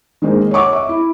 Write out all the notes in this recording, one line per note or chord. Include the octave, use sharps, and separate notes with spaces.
D#3 G#3 A#3 D#4 C5
C#5 D#5 F#5 C#6 D6
E5
E4